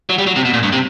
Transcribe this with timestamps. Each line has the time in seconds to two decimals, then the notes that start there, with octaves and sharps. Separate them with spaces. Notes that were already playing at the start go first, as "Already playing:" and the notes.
0.10 F#3
0.18 G3
0.27 F#3
0.36 C3
0.45 B2
0.54 A#2
0.63 G2
0.73 C3